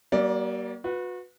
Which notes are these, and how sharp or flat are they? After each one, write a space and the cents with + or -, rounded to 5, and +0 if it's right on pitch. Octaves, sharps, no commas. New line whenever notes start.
G3 -45 A#3 +30 D5 +5
F#4 -35 B4 +0